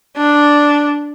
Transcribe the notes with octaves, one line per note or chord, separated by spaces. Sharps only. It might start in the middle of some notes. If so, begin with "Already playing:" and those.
D4